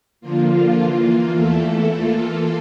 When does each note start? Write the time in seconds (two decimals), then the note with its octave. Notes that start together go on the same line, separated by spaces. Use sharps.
0.21 D3 F3 A#3 F4
0.78 E3 A#3 F4
1.35 E2 E3 A3 E4 A4
1.93 E3 A#3 F4 A4